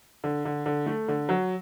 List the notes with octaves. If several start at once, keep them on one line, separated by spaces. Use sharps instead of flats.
D3
D3
D3
A3
D3
F#3